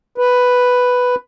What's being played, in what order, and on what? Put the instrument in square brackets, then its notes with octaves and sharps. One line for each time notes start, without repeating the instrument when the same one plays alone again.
[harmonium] B4